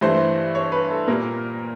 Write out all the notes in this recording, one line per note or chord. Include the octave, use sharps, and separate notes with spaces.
G2 E3 A3 C5
C#5
B4
A4
A#2 G3 A#3 A#4